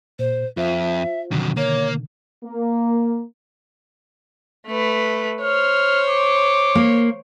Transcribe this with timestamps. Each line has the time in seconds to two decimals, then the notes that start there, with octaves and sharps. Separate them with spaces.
0.19 A#2 C5
0.57 F2 F4 C5 E5
1.31 F2 B2 D3 D#3 F#3
1.57 A#3 C#5
2.44 A#3
4.67 A3 B4
5.42 C5 C#5 F6
6.09 D6
6.75 A#3